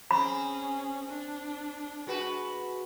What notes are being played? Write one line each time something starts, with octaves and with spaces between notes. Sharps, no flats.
C4 C#4 G#4 B5
D4
G#3 F#4 B4